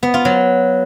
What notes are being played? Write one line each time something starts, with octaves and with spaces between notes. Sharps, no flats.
B3
F4
F#3